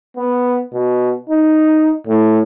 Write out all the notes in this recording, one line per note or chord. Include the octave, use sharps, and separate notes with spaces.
B3
B2
D#4
A2